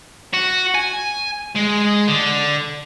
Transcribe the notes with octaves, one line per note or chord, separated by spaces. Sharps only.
F#4
G#5
G#3
D3